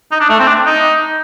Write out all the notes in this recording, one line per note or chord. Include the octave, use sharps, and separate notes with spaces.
D#4
D4
A3
C4
D4
D#4